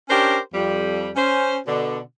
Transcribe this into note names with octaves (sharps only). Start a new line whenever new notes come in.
C#4 D4 G4 A#4 C5 C#5
F2 G3
C#4 C5
B2 D3